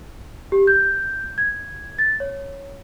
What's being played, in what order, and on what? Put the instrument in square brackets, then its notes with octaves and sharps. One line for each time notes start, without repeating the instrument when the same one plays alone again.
[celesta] G4
G6
G#6
A6
C#5